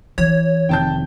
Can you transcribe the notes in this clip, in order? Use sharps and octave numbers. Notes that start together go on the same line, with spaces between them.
E3 C#5
F1 C3 D#3 G5 A5 G6